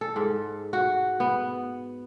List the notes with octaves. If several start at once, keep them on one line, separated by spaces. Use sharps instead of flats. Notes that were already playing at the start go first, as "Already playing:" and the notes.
A4
G#2
F#4
B3